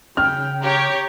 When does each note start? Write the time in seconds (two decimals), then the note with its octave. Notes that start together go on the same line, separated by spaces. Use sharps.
0.17 C#3 G5 F6
0.62 G4 C#5 A#5